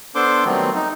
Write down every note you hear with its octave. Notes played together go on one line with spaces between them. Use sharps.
B3 D4 A4 C5 C6 D6
D#3 F#3 G3 A3 B3 C4
D#4